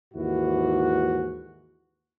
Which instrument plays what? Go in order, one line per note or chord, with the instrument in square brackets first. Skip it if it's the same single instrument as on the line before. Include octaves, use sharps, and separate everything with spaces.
[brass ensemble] D#2 G#2 E3 E4 F#4